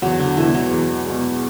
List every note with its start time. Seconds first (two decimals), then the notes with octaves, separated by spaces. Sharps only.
0.02 E2 F#3
0.19 D3
0.36 B2 E3 G#3
0.54 F#3
0.71 E2
1.06 B2 G#3